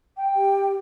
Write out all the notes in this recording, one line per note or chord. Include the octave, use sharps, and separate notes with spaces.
G5
G4